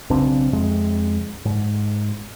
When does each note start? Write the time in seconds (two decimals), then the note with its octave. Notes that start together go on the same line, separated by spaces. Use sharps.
0.10 B1 C#3 C4 D4
0.53 F2 C3 G#3
1.45 G#2